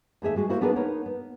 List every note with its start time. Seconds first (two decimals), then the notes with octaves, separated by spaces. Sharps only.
0.22 D#2 A3 G#4 E5
0.36 G#3 F#4 G#4
0.49 A#3 E4 F#4 A#4 C5
0.61 B3 D4 D#4 G#4 A#4 B4
0.76 B3 D#4 A#4 C#5
1.06 B3